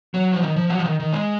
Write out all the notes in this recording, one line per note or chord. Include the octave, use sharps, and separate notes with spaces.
F#3
F3
D#3
F3
F#3
F3
D#3
D#3
G#3